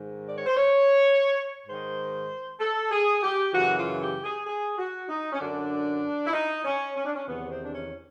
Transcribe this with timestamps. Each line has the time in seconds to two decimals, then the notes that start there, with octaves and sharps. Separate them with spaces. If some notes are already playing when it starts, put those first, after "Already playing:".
Already playing: G#2 D#3
0.27 D5
0.37 C#5
0.46 C5
0.57 C#5
1.67 G#2 D#3 C5
2.60 A4
2.91 G#4
3.23 G4
3.53 F#2 C#3 E3 F#4
3.76 F4
4.00 G4
4.24 G#4
4.47 G#4
4.78 F#4
5.09 D#4
5.33 C#4
5.40 F#2 D3 D4
6.27 E4
6.33 D#4
6.65 C#4
6.96 C#4
7.05 D4
7.15 C#4
7.26 E2 C3 D#3 B3
7.50 C4
7.62 D4
7.73 C#4